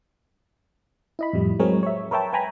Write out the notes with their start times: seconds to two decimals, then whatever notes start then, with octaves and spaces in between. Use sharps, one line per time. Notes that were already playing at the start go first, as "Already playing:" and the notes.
1.19 E4 D#5 B5
1.33 F2 A2 G3
1.59 F#3 G#3 C4 G#4 A#4 C#5
1.83 C#5 E5
2.11 A#4 B4 C#5 E5 G5 A5
2.33 B4 G5 G#5 A#5 B5